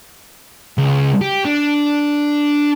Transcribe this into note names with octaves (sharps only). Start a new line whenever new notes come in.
C#2
G4
D4